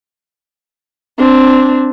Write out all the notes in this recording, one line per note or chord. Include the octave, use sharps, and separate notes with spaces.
C4 D4